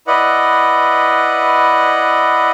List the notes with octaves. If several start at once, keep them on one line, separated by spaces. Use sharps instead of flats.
E4 B4 D5 D#5 F#5